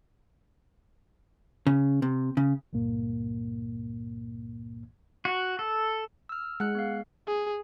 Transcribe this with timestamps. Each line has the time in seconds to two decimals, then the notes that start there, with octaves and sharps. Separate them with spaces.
1.67 C#3
2.02 C3
2.37 C#3
2.73 C#2 G2 A#2 A#3
5.25 F#4
5.59 A4
6.29 E6 F6
6.60 G#3 F#5 F#6
6.75 B3 F5
7.27 G#4